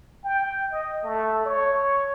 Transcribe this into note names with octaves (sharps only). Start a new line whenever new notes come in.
G5
D#5
A3
C#5